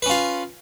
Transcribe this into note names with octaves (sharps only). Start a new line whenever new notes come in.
C#4 F4 B4